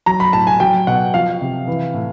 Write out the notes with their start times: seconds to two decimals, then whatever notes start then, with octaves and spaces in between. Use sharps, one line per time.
0.06 F#3 A#5
0.20 B5
0.33 A2 A5
0.47 G#5
0.60 F#3 G5
0.87 B2 F#5
1.14 F3 F5
1.41 C3
1.68 E3
1.94 A2